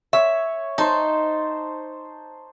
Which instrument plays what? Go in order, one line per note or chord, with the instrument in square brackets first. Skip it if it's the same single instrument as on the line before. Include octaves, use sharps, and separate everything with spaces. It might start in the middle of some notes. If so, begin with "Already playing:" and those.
[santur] C#5 [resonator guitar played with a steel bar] E5
[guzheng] D#4 [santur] C5 A5